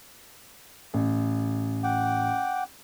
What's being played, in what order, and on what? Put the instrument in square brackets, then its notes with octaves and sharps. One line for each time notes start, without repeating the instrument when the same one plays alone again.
[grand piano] A1
[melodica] F#5 G5 D6